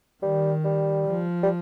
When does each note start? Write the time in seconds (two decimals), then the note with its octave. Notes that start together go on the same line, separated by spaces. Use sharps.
0.22 D#3 G3
0.64 G3
1.07 F3
1.43 G3